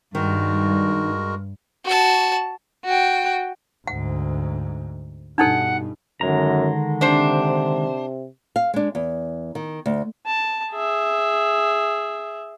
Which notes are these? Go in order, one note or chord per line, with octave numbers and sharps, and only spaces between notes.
G2 D#3 G#3 F#4 A#4
F#4 A5
F#4 G5
D2 G#2 F#5
G2 B2 D4 D#4 A4 F#5
F#2 D3 D#3 G#3 A#5
C3 D4 C5
F5
G#3 D4
E2
D#3
D2
A5
G#4 E5